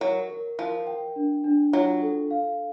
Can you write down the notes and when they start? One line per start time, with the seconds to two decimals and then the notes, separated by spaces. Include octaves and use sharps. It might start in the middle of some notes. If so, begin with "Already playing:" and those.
0.01 F#3 A#4
0.29 A#4
0.59 F3 A#4
0.87 G5
1.16 D4
1.44 D4
1.73 F#3 F4
2.02 A4
2.31 F5